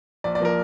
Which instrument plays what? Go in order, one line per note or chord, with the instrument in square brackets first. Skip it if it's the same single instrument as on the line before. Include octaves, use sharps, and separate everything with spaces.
[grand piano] A#1 D5
D5
F3 A#3 A#4